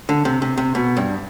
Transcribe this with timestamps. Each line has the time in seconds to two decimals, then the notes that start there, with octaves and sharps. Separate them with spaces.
0.09 D3
0.25 C3
0.42 C3
0.58 C3
0.75 B2
0.97 G2